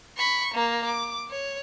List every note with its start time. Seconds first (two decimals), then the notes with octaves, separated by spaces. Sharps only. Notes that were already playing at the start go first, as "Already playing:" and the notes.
0.17 B5 C#6
0.54 A#3 A#4
0.85 D6
1.30 C#5